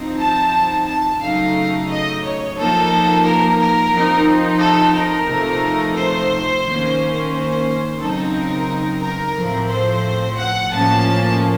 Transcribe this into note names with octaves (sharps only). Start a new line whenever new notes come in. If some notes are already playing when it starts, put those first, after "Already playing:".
Already playing: F3 C4 D#4
A5
A5
C#3 F#3 A3 D#4 F5
D#5
C#5
F3 A#3 D#4 A4
A#4
A#4
F3 C4 D#4
A4
A#4
C3 F3 A3 D#4
C5
D#3 A#3 C#4
C5
C#3 F#3 C4 D#4 A4
A#4
A#4
A2 F3 A3 C4
C5
F#5
A2 F3 A#3 C#4 A5